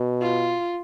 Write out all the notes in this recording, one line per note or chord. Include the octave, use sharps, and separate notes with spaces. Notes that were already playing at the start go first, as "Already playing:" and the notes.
Already playing: B2
F4